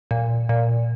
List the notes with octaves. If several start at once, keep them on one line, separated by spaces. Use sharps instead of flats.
A#2
A#2